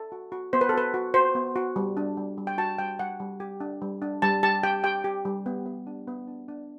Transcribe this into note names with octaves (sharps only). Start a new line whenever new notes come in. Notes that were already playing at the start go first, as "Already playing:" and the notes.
Already playing: A4
F#4
F#4
B3 C5
B4
A4
F#4 B4
F#4
F#4 C5
B3
F#4
G3
D4
G3
G3
G5
F#4 A5
G3 G5
G3 F#5
G3
G4
D4
G3
D4
G3 A5
G4 A5
G4 G5
G4 G5
G4
G3
B3
B3
D4
B3
D4
D4